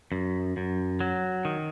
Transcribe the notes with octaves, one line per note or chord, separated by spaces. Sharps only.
F#2
F#2
F#3
D#3